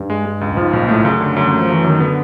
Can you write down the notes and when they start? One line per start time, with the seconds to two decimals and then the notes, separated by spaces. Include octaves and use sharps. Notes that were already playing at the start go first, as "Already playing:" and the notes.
Already playing: G2
0.10 G#3
0.26 G#3
0.41 C#2
0.53 G2
0.57 G#2 F3
0.73 B1 A#2
0.89 A2 A3
1.04 F#2 C#3
1.21 D3
1.36 F#2
1.46 F#3
1.53 A3
1.59 F3
1.69 E3 F#3
1.84 F#2 D#3
2.00 D3 B3